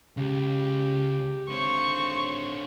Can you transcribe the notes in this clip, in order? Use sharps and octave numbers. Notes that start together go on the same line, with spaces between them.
C#2 C#3 G4
G#1 D3 C5 C#5 C#6